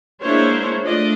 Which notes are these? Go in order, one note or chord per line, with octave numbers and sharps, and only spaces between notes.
G#3 A#3 D4 E4 C5 C#5
A3 D4 F4 D5 D#5